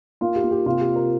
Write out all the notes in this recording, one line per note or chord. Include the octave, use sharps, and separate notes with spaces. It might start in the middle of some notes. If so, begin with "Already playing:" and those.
A#3 F4
G4
A#3
G4
C3 F4
G4
C4
A#4